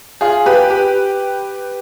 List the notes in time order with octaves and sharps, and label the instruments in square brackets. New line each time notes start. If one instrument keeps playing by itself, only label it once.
[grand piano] F4 G#4
G4 B4
G4 B4